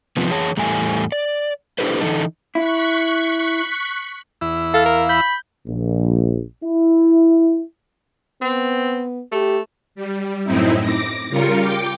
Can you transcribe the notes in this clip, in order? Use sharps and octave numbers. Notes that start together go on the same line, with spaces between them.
E2 C3 F3 B3
E3 G#4 C#5 A5
E2 A2 G3 A3 G#5
D5
D4 E4 G4 A4 B4 C5
D3 E3 G#3 D#4 A4
E4 C#6 F#6 B6
E2 E4
A4 F5 F6
A#4
B5 G6
A#1
E4
B3 C4
A3 G4
G3
F#2 A2 C4 D#4 E4
D6 A#6
C#3 G3 F4 A#4 C#7
G5 D6